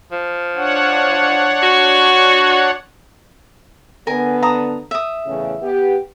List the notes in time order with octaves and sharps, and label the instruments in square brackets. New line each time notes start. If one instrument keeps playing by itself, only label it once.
[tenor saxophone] F3
[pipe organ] D4 C#5 F#5
[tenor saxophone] F#4
[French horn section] D3 B3 [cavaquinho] A#4 G#5
[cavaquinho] A5 A#5 D#6
E5 D#6
[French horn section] E2 A2 C#3
B3 G4